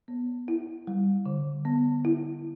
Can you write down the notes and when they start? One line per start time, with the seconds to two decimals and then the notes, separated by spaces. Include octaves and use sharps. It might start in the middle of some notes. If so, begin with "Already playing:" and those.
0.08 B3
0.48 E4
0.87 G3
1.26 D3
1.65 B3
2.05 E4